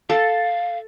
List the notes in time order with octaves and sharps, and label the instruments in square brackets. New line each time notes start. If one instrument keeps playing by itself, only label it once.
[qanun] A4 [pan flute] F5